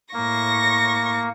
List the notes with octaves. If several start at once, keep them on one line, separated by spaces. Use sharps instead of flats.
A2 A#3 C#6 A#6